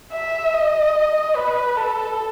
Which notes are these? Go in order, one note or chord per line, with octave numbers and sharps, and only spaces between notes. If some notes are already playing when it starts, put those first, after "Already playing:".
E5
D#5
B4
A4